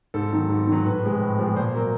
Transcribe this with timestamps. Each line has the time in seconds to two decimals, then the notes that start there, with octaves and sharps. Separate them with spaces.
0.14 G#2 A4
0.31 D#3 F#3
0.49 G#2
0.67 D#3 F#3
0.86 A2 B4
1.03 F3 G#3 C4
1.21 A2
1.38 F3 G#3 C4
1.56 A#2 C5
1.74 F#3 A#3